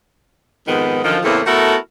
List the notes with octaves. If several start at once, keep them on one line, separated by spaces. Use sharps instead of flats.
F2 G#2 D#3 B3
F#2 D3 D#3 F3
E2 A2 C#3 A3 A#3 C4
A3 B3 E4 F#4 A4 A#4